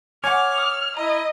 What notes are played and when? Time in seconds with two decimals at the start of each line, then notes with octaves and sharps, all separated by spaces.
0.24 C#5 F#5 G#5 D6 F6
0.58 D#6
0.97 E4 D#5 A#5